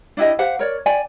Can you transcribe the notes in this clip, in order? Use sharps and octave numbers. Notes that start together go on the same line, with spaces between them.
D4 E4 G4 D#5
G4 C5 F5 F#5
A#4 C#5 D5
D5 G5 G#5